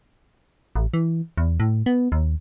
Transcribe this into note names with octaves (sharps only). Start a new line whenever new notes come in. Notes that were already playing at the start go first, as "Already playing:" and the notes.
A1
E3
E2
A2
B3
D#2